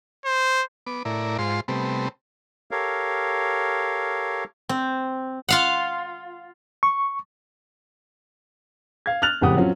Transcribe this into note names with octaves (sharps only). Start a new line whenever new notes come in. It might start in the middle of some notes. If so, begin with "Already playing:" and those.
C5
B3 D6
A2 E4 A#4 D5
G#2 F4 C5 C6
C3 G3 A3 B3 C4
G4 A4 A#4 C#5 F5
C4
F4 F5 F#5
C#6
F5 G#6
F6 F#6 A6 F7
F#1 F2 A2 G4 F#5 D#6
F#3 C4 C#4 F4